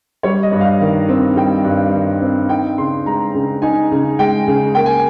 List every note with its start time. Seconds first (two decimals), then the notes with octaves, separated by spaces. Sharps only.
0.23 G3 C#5
0.43 D#5
0.52 G2
0.61 F5
0.81 D#3
1.09 C4
1.36 G3 G5
1.64 G2
1.94 D#3
2.21 C4
2.49 D#4 G5
2.78 C#3 C6
3.06 G#3 A#5
3.34 C#3
3.62 D#4 G#5
3.91 C#3
4.19 G#3 G5
4.47 C#3
4.75 A#3 G5
4.86 G#5